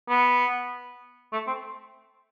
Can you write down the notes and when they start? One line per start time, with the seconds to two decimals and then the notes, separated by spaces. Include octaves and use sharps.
0.10 B3
1.33 A3
1.47 C4